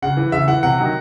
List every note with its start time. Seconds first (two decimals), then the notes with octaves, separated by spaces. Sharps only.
0.02 C#3 F#5
0.17 E3
0.32 C#3 E5
0.48 E3 F#5
0.63 C3 F#5
0.78 D#3 F#3